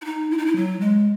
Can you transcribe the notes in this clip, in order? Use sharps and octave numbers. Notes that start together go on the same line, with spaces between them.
E4
D#4
E4
D#4
E4
F#3
G#3